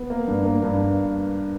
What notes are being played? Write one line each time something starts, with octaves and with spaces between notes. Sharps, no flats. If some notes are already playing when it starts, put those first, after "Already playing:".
Already playing: B3
A#3
G2
A#3
G2